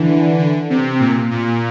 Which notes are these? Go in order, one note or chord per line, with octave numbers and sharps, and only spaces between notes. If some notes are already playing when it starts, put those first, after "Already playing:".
Already playing: D3 E3
D3
C3
A#2
A#2